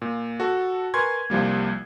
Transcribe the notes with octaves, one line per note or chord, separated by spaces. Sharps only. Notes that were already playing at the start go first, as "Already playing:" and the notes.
A#2
F#4 A4
A#4 B4 G#5 C6 C#6 G#6
C2 F3 G3 A#3